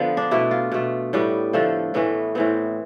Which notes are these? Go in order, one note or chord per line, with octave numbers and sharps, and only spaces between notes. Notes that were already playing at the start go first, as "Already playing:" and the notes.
Already playing: D3 F3 B3
D4
B2 A3 E4
F4
B2 A3
A2 G3 B3
D3 F3 A3 A4
A2 E3 A3 B3
A2 E3 B3 C4